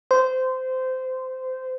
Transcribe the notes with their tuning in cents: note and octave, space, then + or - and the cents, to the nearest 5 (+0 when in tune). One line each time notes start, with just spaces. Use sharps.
C5 -20